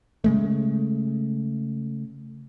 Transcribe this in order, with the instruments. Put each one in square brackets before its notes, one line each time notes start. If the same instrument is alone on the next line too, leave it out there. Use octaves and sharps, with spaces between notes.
[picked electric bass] C#3 G#3 A3